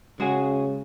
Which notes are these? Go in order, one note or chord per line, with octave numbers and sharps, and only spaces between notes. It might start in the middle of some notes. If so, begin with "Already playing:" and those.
C#3 G#3 F#4 G#4